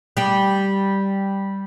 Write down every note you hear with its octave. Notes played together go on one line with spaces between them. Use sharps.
G3 G4